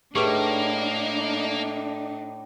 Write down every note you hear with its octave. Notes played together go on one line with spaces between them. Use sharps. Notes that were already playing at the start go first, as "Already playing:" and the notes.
A2 A#3 D4 D#4 G4 G#4 B4